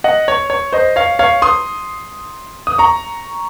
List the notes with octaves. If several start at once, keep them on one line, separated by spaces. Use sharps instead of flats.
D#5 F#5
C#5
C#5
C5 D#5
C#5 F5
C#5 F5
C6 D#6
D#6
A#5 C#6